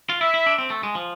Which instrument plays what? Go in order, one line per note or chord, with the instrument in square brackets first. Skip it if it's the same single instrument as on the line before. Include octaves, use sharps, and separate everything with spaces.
[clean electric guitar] F4
[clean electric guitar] E4 [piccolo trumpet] E5
[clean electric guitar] E4
D4
C4
A3
G#3
F3